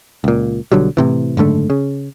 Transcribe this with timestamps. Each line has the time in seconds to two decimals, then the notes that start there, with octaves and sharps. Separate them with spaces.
0.24 C#2 A#2
0.72 B1 D3 F#3 G3
0.97 A2 C3 E3
1.37 F#1 G#2 D3 A3
1.70 C#3